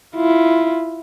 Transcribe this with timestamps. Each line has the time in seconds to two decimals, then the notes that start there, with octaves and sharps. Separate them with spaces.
0.16 E4 F4